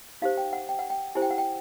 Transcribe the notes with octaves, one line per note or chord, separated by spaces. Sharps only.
D#4 G4 C5 F5
G5
F#5
G5
F#5
G5
E4 G4 C5 G#5
G5
F#5
G5